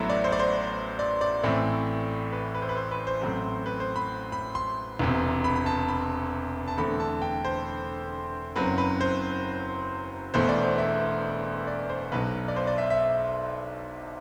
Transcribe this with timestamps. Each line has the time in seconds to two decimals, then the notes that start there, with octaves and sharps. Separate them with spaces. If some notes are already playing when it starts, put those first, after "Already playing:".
Already playing: A1 A2 F#3 B3 C5 E5
0.09 D5
0.24 C5
0.32 D5
0.39 C5
0.99 D5
1.21 D5
1.43 A1 A2 E3 A3 C4
2.32 B4
2.55 B4
2.62 C5
2.69 B4
2.77 C5
2.91 B4
3.07 C5
3.21 A1 A2 F#3 C4
3.66 B4
3.80 C5
3.96 B5
4.32 B5
4.55 C6
4.99 E1 E2 C3
5.44 B5
5.56 B5
5.66 A5
5.88 B5
6.68 A5
6.77 E2 D3 A3 C4 B5
7.00 A5
7.22 G5
7.45 C5
8.56 F#1 F#2 F#3 C4 B4
8.78 B4
9.01 C5
10.34 E1 E2 B2 A3 C5
10.49 D5
10.64 C5
10.78 E5
11.67 D5
11.89 C5
12.12 B1 B2 F#3 B4
12.48 D5
12.56 C5
12.67 D5
12.78 E5
12.90 E5